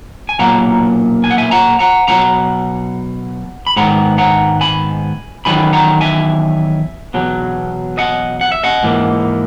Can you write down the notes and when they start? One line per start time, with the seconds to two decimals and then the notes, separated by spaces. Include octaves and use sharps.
0.29 G#5
0.39 B1 A#2 F#3 A#3 F#5 A#5
1.24 G#5
1.31 F#5
1.38 E5 G#5
1.51 F#5 A#5
1.79 F#5 A#5
2.08 B1 B2 F#3 F#5 A#5
3.67 B5
3.76 G#2 D#3 G#3 B3 F#5 A#5
4.18 F#5 A#5
4.61 G#5 B5
5.45 E2 D#3 F#3 B3 G#5 B5
5.73 F#5 A#5
6.01 E5 G#5
7.14 E2 B2 F#3
7.98 D#5 F#5
8.41 F#5
8.52 E5
8.64 D#5 F#5
8.83 G#2 E3 A#3